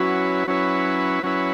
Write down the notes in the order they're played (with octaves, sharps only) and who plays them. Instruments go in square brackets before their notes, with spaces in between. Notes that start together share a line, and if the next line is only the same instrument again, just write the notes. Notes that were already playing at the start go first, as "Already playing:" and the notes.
Already playing: [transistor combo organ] F#3 C#4 E4 B4 [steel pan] F#4
[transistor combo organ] F#3 C#4 E4 B4
F#3 C#4 E4 B4